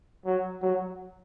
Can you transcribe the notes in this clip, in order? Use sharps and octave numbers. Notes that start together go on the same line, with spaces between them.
F#3
F#3